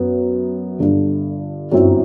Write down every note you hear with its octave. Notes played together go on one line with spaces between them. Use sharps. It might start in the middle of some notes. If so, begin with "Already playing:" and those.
Already playing: F#2 F#3 B3
G1 G2 D3
G1 F#2 F#3 C4 E4